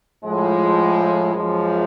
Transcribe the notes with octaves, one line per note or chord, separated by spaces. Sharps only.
A2 F3 G#3
F#2 F3 G#3